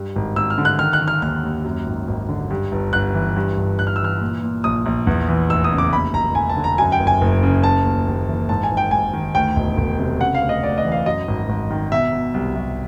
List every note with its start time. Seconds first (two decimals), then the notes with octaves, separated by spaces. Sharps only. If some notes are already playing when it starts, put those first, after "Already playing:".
Already playing: G2
0.16 G#1
0.36 G#1 E6
0.50 F6
0.58 D3
0.65 F#6
0.79 D#3 F6
0.93 F#6
1.01 D#3
1.08 F6
1.22 D#2 F6
1.44 D#2
1.64 F#2
1.86 G#1
2.07 G#1
2.29 D3
2.50 G2
2.72 G1
2.93 G1 F#6
3.14 E3
3.36 G2
3.57 G1
3.79 G1 F#6
3.87 F6
3.96 E6
4.00 E3 F6
4.21 A#2
4.43 A#2
4.64 A#1 D#6
4.86 A#1
5.07 E2
5.28 E3
5.50 F1 E6
5.64 D#6
5.71 C#3
5.78 D6
5.93 D#2 B5
6.14 E1 A#5
6.35 E1 G#5
6.49 A5
6.57 D3
6.64 A#5
6.78 F#2 G#5
6.92 G5
7.00 F#1
7.07 G#5
7.21 F#1
7.43 C#3
7.63 C#3 A5
7.85 D#2
8.07 D#2
8.28 E3
8.49 G#2 A5
8.63 G#5
8.71 G#1
8.77 G5
8.91 G#1 G#5
9.13 D#3
9.35 D2 G5
9.56 E1
9.77 E1
9.99 C3
10.21 C#3 F#5
10.35 F5
10.42 D2
10.49 D#5
10.63 D2 D5
10.78 D#5
10.85 E3
10.92 F5
11.06 F#2 D#5
11.28 G#1
11.49 G#1
11.70 D#3
11.92 B2 E5
12.13 B2
12.34 C2
12.55 C2